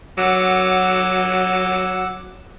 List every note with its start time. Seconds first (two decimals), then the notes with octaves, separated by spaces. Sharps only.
0.18 F#3 F#5 D6 E6